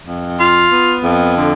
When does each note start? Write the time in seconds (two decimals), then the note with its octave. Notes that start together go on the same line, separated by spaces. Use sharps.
0.06 F2
0.39 F4
0.71 B3
1.02 F2
1.36 D3